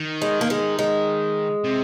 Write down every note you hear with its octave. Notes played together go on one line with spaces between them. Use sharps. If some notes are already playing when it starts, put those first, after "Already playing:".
Already playing: D#3
G#3
A#3
G#3
G#3
C3